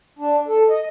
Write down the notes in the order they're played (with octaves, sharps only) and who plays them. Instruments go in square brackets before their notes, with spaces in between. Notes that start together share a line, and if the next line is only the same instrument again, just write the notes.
[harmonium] D4
A4
D#5